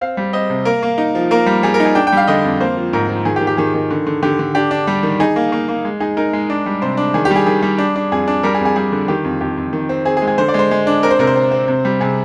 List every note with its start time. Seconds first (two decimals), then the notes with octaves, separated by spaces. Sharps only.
0.01 C4 F5
0.17 G3
0.33 C4 D#5
0.50 C3
0.65 A#3 A#4
0.83 A#3
0.98 D#4
1.15 F3
1.31 A#3 A#4
1.46 G3
1.63 G3 G#4
1.74 A#4
1.80 D#4
1.85 G#4
1.95 D4 G5
2.07 G5
2.12 G3 F5
2.28 D3 D#5
2.44 F2
2.60 A#3 C5
2.77 F3
2.93 G#2 A#4
3.09 F3
3.25 D#3 G#4
3.36 G4
3.41 D#3
3.47 G4
3.57 D#3 G#4
3.74 D#3
3.91 D3
4.07 D3
4.23 D3 G4
4.39 D3
4.55 D4 G4
4.71 D4
4.87 G3
5.03 D#3
5.20 D#4 G#4
5.36 A#3
5.52 A#3
5.68 A#3
5.85 G#3
6.00 D#4 G#4
6.17 D#4 A#4
6.33 G#3
6.50 D4
6.66 G3
6.82 C3 C5
6.97 D4
7.14 D#3 G#4
7.25 G4
7.31 G3 G#4
7.46 D#3 G#4
7.62 G3
7.78 D4
7.96 D4
8.12 F2 G#4
8.28 D4
8.43 G3 A#4
8.54 G#4
8.60 F2
8.65 G#4
8.76 G3 G#4
8.92 D3
9.08 D#3 G4
9.24 F2
9.41 F2 G4
9.57 F2
9.73 D#3
9.89 C4
10.05 C4 G#4
10.17 G#4
10.22 G#3
10.27 G#4
10.38 D3 C5
10.48 D5
10.54 G#3 C5
10.71 G#3
10.87 D4
11.03 C4 A#4
11.11 C5
11.19 C3 A#4
11.27 C5
11.36 C4
11.51 C4
11.68 C3
11.85 G3
12.00 C3 G#4